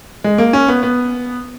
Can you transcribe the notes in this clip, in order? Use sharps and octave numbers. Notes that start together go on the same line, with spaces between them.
G#3
A#3
C#4
B3
B3